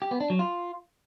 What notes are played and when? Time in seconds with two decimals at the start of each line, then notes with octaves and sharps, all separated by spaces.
0.02 G4
0.11 B3
0.20 D4
0.30 F#3
0.39 F4